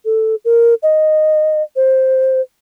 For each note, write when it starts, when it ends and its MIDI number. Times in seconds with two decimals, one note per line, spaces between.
0.05 0.35 69
0.45 0.74 70
0.83 1.63 75
1.76 2.41 72